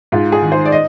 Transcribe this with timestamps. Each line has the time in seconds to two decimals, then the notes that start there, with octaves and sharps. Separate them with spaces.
0.12 G#2 F4
0.32 G#4
0.42 D#3
0.52 C5
0.65 D5
0.72 D#5